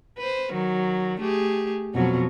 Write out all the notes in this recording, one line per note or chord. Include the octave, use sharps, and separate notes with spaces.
B4 C5
D#3 F#3
A3 G4 G#4
F2 B2 F#3